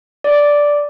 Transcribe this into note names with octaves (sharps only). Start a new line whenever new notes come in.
D5